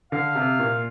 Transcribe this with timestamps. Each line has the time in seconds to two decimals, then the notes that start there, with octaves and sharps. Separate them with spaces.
0.12 D3 F5
0.36 C3
0.59 A#2